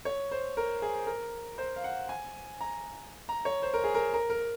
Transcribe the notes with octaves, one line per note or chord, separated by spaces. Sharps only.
C#5
C5
A#4
G#4
A#4
C5
F5
F#5
G#5
A#5
A#5
C#5
C5
A#4
G#4
A#4
A#4
A#4